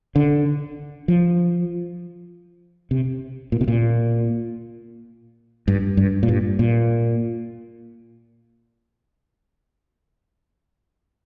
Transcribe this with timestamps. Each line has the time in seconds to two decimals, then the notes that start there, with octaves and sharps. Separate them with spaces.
0.16 D3
1.08 F3
2.91 C3
3.52 A#2
3.61 C3
3.68 A#2
5.68 G2
5.97 G2
6.23 A#2
6.28 G2
6.59 A#2